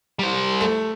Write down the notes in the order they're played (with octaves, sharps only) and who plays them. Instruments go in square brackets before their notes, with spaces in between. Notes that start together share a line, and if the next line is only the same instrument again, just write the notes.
[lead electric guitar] G3 C5
[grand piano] A3